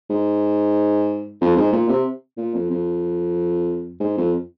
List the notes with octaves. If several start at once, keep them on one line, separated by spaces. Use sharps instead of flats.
G#2
F2
G#2
A#2
C3
A#2
F2
F2
G#2
F2